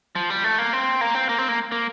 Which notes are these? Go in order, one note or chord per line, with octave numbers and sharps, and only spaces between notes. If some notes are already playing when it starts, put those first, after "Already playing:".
F3
G3
A3
A#3
C4
A#3
C4
A#3
C4
A#3
A#3